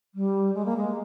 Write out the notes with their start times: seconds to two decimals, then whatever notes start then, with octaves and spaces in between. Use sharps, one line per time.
0.14 G3
0.54 G#3
0.65 A#3
0.77 G#3